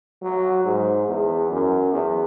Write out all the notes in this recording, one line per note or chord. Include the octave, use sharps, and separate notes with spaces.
F#3
G#2
E2
F#2
E2